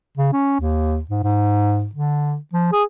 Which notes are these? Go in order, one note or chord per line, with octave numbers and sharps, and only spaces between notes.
C#3
C#4
D#2
G#2
G#2
D3
F3
G#4